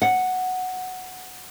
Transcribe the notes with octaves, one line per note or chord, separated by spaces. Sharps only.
F#5